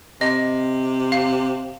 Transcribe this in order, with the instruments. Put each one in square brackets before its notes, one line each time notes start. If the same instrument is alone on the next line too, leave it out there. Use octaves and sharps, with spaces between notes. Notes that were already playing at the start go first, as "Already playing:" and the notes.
[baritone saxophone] C3 [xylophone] D#5
[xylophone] F5